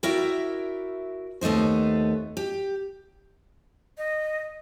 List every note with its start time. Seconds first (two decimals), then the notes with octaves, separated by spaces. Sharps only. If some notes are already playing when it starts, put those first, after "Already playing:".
0.03 E4 F#4 A#4 D5 E5 G5
1.41 D#2 A3 B3 D#4 C5
2.37 G4
3.98 D#5